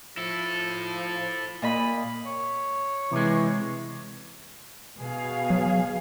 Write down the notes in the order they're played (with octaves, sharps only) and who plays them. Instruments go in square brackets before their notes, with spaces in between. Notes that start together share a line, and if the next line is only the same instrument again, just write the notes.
[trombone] F3 [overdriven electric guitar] E4 A4
[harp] A#2 D#5 B5
[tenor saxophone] C#5
[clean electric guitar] C3 G#3 [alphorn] E3
[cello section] B2 G#4 F5
[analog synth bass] F#3